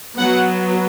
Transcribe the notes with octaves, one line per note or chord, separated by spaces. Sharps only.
F#3 B3 F#5